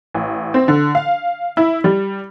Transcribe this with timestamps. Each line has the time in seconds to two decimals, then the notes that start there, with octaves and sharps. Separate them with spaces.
0.14 A1
0.54 C4
0.68 D3
0.95 F5
1.57 E4
1.84 G3